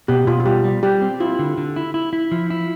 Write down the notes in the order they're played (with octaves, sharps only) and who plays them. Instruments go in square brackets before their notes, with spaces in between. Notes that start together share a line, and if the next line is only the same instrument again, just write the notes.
[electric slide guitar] B2 [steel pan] G4
[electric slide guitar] B2 [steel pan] F4
[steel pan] F4
[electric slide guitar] G3 [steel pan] G4
[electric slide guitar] G3
[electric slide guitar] G3 [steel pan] G4
[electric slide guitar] C4
[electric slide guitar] E4 [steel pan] F4
[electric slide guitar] D3
D3
E4
E4
E4
F3
E4